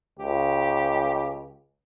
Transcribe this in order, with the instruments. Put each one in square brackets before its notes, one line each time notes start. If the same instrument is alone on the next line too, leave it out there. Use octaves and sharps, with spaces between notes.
[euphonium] C#2 [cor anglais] G4